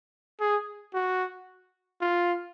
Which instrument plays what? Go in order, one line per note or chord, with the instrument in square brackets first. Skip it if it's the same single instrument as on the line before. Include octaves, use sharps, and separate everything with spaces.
[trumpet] G#4
F#4
F4